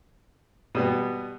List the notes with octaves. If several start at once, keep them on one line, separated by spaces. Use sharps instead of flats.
B2 G3 B3